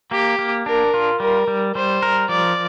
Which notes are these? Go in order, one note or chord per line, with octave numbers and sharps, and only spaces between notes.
A#3 G4
A#3
D4 A#4
F4
G3 A#4
G3
G3 C5
A#4
F3 D5